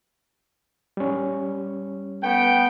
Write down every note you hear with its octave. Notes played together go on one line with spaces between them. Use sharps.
G3 C#4
A3 B3 G5